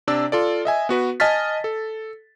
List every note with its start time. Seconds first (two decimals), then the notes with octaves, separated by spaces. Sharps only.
0.07 C3 D4 D5 E6
0.32 F4 A4 D5
0.65 D#5 E5 G#5
0.89 B3 F#4 B4
1.20 D#5 G#5 A5 F6 A6 B6
1.64 A4